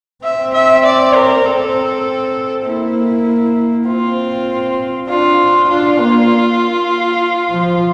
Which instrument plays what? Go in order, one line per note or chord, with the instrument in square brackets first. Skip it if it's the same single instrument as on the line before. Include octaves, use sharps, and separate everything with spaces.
[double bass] C4 [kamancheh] E5
[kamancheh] E5
D5
A#4
[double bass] C4 [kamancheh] A4
[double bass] A#3 [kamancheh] E4
[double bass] C4 [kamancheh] F4
[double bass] D4 [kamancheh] F4
[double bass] D4 [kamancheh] F4
[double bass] A#3
F3